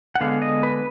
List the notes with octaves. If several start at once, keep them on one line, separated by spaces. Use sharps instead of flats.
F#5
D3 G#3 B3 F5
D#5
B4